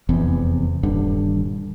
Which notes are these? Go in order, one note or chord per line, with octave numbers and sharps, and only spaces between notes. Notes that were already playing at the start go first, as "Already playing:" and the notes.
F1 E2 C3
D#1 G2 D3